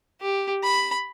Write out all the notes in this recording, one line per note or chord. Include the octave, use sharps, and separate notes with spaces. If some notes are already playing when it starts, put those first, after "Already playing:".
G4
B5